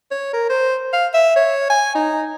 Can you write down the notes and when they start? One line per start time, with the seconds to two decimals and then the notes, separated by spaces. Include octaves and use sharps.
0.11 C#5
0.33 A#4
0.49 C5
0.93 F5
1.14 E5
1.36 C#5
1.70 G#5
1.95 D#4